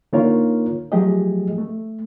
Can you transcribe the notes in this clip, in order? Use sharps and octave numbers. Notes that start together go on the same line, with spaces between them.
D3 A#3 D#4 F4 A#4 C#5
F3 F#3 A3 G4 G#4 D#5
A3